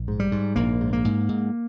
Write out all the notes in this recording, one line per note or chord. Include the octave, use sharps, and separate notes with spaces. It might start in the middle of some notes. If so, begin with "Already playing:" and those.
Already playing: A#1
G#2
G3
G#2
A#1 A#3
G#2
A#3
G#2
G#2